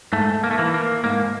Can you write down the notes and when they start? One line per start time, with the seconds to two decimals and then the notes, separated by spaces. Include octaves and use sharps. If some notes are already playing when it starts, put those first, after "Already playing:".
0.13 G#2 A3
0.44 A#3
0.51 A3
0.58 E3 A#3
0.74 A#3
1.04 G#2 A#3